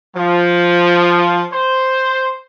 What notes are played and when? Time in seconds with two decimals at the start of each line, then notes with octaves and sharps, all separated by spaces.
0.16 F3
1.53 C5